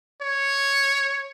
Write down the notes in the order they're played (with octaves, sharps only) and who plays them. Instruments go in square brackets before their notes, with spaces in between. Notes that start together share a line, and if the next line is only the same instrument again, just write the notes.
[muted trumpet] C#5